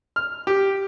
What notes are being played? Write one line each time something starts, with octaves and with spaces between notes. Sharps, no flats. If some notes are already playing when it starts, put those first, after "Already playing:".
F6
G4